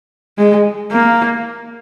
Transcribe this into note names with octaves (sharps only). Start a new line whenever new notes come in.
G#3
A#3